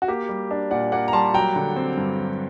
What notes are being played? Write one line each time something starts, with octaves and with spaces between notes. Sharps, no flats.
F#4
A#3 G4
G3
D4
A#2 D5 F#5
A#3 D5 F#5
A#5
G3 A5 C6
F#3 G5 A#5
D3
C4
G2
F#3